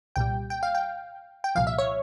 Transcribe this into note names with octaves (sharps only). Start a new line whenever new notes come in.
C2 A#2 G3 G5
G5
F5
G5
G5
C2 A#2 F3 F5
E5
C#5